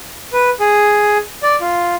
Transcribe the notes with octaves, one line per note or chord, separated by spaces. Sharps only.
B4
G#4
D5
F4